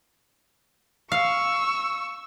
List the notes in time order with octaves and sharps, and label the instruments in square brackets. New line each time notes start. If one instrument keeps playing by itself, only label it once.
[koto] F5 [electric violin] C#6 E6